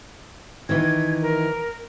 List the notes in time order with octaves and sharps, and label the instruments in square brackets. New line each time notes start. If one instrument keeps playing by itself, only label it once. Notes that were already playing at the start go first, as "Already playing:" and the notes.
[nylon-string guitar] D#3 E3 [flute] G#6
[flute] A#4